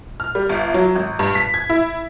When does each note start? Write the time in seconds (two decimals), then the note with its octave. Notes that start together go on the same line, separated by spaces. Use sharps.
0.20 F6
0.35 G3
0.49 G1
0.74 F#3
0.95 G#1
1.19 G2
1.35 B6
1.54 G#6
1.70 E4